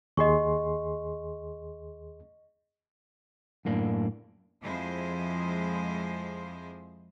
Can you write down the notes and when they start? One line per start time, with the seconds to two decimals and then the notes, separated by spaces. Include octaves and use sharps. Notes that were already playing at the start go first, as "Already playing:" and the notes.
0.17 D#2 G#4 D#5 C6 C#6
3.65 F#2 A2 A#3 D4
4.62 F2 F3 G#3 E4 G#4 C5